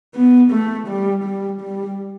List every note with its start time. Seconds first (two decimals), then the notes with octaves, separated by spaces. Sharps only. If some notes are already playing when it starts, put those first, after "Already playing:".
0.15 B3
0.51 A3
0.88 G3
1.24 G3
1.61 G3